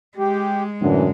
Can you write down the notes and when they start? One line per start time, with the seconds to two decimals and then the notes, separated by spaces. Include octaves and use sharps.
0.18 G#3 G4
0.82 F#2 A2 D3 E3